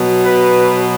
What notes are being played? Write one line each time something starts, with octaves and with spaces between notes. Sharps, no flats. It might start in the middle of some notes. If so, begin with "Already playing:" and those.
Already playing: B2 F#3
B4